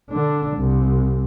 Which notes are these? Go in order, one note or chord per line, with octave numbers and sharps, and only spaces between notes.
D3 D4
C2 C3